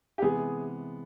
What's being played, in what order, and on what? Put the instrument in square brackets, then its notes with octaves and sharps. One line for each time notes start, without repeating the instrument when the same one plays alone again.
[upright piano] G4
[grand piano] C3 E3 G#3 B3 [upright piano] G#4